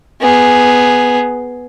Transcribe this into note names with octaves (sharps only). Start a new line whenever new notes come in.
B3 G#4